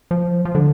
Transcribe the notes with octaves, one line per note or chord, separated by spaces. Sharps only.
F3
F3
D3